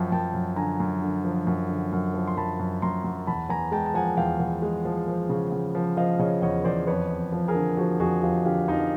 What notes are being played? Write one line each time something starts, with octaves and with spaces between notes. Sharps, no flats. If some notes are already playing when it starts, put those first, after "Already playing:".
Already playing: F#2 F3 G5 A5
F#2 G5 A5
F#2
D3 G#5 A#5
F#2
D3
F3
F#2
D3
F#2
F3
C6
F#2 A5 B5
F#2
F#2 A#5 C6
F#2
E2 A5 B5
E2 G#5 A#5
G#3 G5 A5
A5
F3 F#5 G#5
E2 F5 G5
E2
G#3
F3
F3
C#3
C#3
F3
F3 D#5 F5
C#3 C#5 D#5
E2 C#5 D#5
E2 C5 D5
F2 B4 C#5
F2
F3
G#4 A#4
D3
F3 F#4 G#4
F2 F#4 G#4
F2 F4 G4
D3 F4 G4
F2 D#4 F4